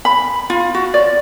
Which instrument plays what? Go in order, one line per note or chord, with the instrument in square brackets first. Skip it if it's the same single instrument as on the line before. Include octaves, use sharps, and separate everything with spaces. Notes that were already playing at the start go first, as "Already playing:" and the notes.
[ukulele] B5
F4
F#4
D5